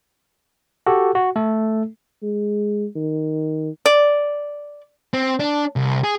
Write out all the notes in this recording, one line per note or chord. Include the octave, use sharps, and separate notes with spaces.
F#4 G4 A4
F#4
A3 A4
G#3
D#3
D5
C4
D4
C2
G#4